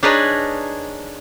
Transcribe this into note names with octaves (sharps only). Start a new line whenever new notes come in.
D4 D#4 G#4 A#4 B4 C#5